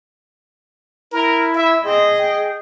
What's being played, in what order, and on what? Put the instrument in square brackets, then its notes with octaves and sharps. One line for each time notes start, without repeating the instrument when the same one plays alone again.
[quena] E4 [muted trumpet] A#4
[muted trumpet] E5
[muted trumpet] C4 [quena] G#4 [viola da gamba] D#5
[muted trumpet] G5